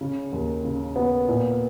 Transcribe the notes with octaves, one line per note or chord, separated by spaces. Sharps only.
C#3
D#2
C#3
B3
A#2